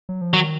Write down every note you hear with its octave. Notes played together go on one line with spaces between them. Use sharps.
F#3
F3
D#3 F#3